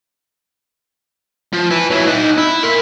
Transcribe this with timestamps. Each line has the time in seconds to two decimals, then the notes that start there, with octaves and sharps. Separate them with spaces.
1.53 F3
1.70 E4 B4
1.90 F#3 E4
2.08 D#4 F#5
2.38 E4
2.63 A#4 C6